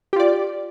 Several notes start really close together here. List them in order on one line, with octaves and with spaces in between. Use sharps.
G4 F4 D5